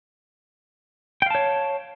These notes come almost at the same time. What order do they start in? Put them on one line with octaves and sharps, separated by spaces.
G5 F5 A5 C#5